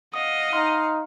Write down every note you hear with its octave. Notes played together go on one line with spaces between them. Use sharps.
D#5 F5 F#5 D#6
D#4 C6 F6